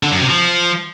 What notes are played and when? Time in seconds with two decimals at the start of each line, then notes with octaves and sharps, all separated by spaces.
0.03 D3
0.12 F#2
0.20 C3
0.29 F3